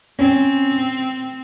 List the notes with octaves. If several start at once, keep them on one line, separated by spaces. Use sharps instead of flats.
C4 C#4